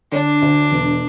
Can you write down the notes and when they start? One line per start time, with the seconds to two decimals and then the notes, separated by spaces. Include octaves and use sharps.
0.12 D3 D4
0.42 D2
0.71 E1